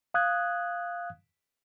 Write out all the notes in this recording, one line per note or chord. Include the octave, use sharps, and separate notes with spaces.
F5 D#6 F#6 G#6